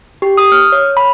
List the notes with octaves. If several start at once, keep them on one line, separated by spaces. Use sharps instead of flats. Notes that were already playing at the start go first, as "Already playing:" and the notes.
G4
D#6
F6
C#5
B5